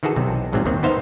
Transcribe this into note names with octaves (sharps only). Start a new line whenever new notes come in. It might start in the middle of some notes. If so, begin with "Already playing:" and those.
D#3 E3 F#4 G#4 A4
B1 C3 C4
A#1 G#2 C3 F#3 C4
D#2 D#3 C4
B3 D#4 C5 E5 F5